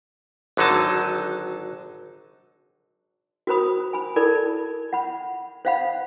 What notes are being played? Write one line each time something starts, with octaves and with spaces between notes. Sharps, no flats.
G#1 D3 F#3 D#4 A5
F#4 A#4 C5 A#5 B5 D#6
G#5 B5
E4 A4 A#4 D5 A5 B5
F#5 B5
C5 D#5 F5 F#5 B5